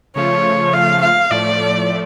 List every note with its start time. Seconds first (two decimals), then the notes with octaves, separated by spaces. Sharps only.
0.16 C#3 F3 A3 F4 C#5
0.73 F5
1.02 F5
1.31 A2 F3 A3 D5